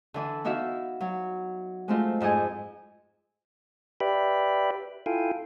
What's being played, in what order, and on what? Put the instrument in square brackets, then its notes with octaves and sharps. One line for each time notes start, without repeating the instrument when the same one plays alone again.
[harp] D3 E3 D4
B3 D#4 E4 F#4 E5 F5
F#3
G#3 A3 C4 D#4 F4
F2 G#2 D#4 D#5 G#5
[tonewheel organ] G4 B4 D5 E5 G5 B5
E4 F4 A4 F5 G5 G#5